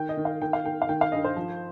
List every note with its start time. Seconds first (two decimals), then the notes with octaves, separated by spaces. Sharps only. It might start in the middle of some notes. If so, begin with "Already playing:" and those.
Already playing: D#3 G5
0.09 D#5
0.17 D#3
0.25 F5
0.41 D#3 G5
0.53 F5
0.65 D#3 G5
0.82 F5
0.89 D#3 G5
1.01 F5
1.12 G2 D#5
1.24 C5
1.36 F3